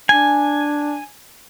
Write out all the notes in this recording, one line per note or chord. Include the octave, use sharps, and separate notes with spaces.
D4 G#5